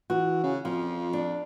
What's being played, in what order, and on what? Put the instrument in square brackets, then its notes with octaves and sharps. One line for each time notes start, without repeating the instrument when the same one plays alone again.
[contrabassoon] E3 [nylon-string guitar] F#4
[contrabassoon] C#3
[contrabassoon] F2 [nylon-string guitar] F3
[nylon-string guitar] D4